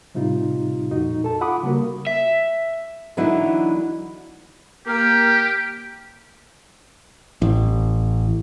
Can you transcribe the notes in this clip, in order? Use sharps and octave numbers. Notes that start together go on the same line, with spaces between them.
A2 C3 G3 D#4 F4
F2 A#2 D#4 F#4
A4 A5
F4 F#5 B5 D6 D#6
C#3 G3 A#3 F#4 A#4
E5
D3 E3 F#3 B3 D#4 E4
A#3 G4 G5 F6
A1